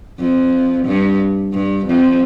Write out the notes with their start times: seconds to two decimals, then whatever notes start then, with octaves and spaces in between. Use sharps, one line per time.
0.19 F2
0.86 G2
1.53 G2
1.86 F2